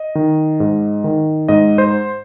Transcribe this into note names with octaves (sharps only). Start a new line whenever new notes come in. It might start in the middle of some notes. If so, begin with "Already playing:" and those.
Already playing: D#5
D#3
G#2
D#3
G#2 D#5
C5